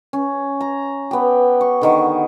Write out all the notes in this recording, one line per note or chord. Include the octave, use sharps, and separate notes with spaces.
C#4
A#5
B3 G4
C#6
D3 D#3 C#6